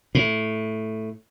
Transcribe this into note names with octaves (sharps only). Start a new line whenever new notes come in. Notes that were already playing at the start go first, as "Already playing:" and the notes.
A2